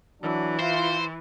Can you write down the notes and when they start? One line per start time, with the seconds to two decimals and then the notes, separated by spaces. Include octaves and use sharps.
0.22 E3 F#3 D4
0.59 E4 F4 C5